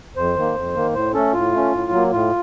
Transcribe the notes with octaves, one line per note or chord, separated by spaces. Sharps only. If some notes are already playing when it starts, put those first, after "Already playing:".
F2 C5
D#3 A#3
F2
D#3 A#3
A2 C5
A3 C#4 A4
A2 F4
A3 C#4
A2
F#3 A#3
A2 F4